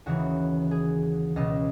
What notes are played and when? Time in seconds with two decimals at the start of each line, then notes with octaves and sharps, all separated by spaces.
0.06 D#2 C#3 E3 F#4
0.71 G#4
1.36 C#2 B2 D#5